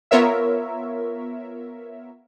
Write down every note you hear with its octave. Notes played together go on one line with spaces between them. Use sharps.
B3 F4 A#4 C#5 E5